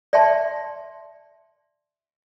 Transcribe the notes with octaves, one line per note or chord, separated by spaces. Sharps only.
D5 E5 G5 A5 C6